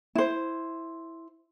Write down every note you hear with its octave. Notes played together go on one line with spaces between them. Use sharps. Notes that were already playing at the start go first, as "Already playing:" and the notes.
E4 C5